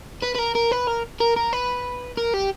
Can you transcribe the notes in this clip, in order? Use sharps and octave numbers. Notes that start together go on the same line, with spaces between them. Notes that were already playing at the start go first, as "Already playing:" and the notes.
B4
B4
A#4
A#4
B4
A#4
A#4
A#4
B4
A#4
G4